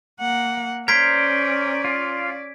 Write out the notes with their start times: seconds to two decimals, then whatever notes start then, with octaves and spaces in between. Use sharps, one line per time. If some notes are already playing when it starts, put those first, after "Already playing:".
0.20 A#3 F#5
0.88 C#4 A#4 C5 D5 G#6 B6 D7
1.84 F4